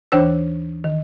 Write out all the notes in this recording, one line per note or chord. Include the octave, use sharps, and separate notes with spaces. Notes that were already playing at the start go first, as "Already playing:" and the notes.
D#2 E3 D4 C5 C#5 E6
D#3